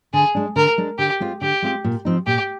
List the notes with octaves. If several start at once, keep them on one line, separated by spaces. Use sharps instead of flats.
D3 G#4
G#3 D4
D3 A#4
G#3 D4
D3 G4
G#3 C4 F4
D3 G4
G#3 C4 F4
A#2
F3 C4 D#4
A#2 G4